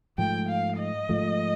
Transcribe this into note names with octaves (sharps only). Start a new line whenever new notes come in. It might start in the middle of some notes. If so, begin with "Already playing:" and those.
G#2 F3 A3 G5
F5
D#5
G#2 F3 A3